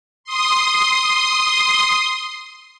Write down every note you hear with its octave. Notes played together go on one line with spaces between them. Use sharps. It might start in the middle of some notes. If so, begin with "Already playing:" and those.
C6 D#6